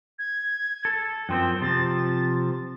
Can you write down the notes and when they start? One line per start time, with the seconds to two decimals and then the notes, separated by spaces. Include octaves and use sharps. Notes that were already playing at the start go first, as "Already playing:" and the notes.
0.19 G#6
0.85 A4
1.29 F#2 F3 C4 G5
1.62 C3 F3 A6